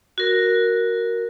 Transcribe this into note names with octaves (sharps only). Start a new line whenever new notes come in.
F#4 A#4